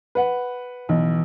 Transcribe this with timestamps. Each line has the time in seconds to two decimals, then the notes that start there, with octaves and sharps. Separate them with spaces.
0.15 B4 F#5
0.89 B1 E3